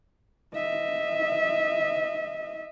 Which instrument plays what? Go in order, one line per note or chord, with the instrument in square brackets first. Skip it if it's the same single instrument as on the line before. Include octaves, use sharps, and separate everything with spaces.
[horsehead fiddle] D#5 E5